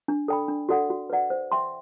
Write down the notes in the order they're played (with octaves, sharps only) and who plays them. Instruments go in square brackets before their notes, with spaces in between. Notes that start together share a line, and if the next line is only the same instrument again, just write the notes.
[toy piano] D4
A4 D5 G5 B5
D4
F#4 A4 D5 F#5
F#4
B4 D5 F#5
C5
E5 G5 C6